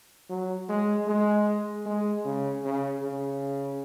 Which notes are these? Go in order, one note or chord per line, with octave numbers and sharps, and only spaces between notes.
F#3
G#3
G#3
G#3
C#3
C#3
C#3